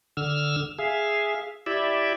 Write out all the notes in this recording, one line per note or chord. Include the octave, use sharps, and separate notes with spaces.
D3 E6 F6
G#4 E5 F5
E4 G4 D5 E5